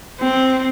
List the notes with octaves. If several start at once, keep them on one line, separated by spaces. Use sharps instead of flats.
C4